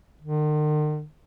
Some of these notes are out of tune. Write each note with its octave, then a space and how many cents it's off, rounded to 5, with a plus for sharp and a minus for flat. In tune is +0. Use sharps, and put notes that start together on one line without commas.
D#3 -45